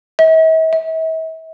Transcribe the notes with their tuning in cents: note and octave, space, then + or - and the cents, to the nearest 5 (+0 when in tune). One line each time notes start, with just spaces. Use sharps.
E5 -45
E5 -40